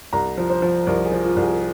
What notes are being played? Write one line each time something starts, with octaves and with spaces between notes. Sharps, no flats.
C2 A#5
F3
C5
F3
C2 A#4
G#4
F3
F4
C2
G#4